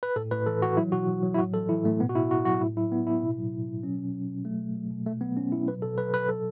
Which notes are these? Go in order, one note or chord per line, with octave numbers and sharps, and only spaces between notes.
B4
A2 A4
A2 B4
E3 A4
E3 F#4
F#3 E4
B2 F#4
F#3
F#3
E4
A2 F#4
E3 A4
E3 E4
A2 A3
B2 B3
F#4
B2 E4
B2 F#4
F#3 F#4
A2 E4
F#3 E4
A2 B3
A2 E4
B2
F#3
B2
B2
F#3 C#4
B2
F#3
B2
F#3 A3
B2
F#3
B2
B2 A3
F#3 B3
F#3 C#4
B2 E4
F#3 B4
B2 A4
F#3 B4
B2 B4
F#3 A4